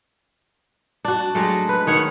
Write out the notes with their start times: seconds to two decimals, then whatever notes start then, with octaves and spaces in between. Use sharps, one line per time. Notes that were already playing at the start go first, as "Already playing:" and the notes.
1.05 D4 F#4
1.35 F#3 G#3 A3
1.69 B4
1.87 D#3 C#5 F#5